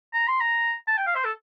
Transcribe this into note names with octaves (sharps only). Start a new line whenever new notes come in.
A#5
C6
A#5
A5
G5
F5
C5
A4